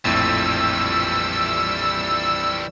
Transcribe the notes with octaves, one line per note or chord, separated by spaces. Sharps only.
A#1 F2 A2 E3 G3 E6